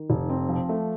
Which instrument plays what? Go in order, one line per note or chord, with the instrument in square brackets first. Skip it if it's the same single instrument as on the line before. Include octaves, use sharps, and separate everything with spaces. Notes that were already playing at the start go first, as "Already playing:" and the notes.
Already playing: [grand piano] D#3
F1
C4
F3
A3